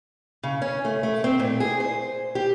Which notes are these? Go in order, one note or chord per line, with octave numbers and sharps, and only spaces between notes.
C#3
C#4
A3
A3
C4
A#2
G#4
C5
G4